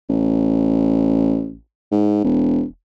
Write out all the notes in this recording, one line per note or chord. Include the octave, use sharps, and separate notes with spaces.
A1
G#2
E1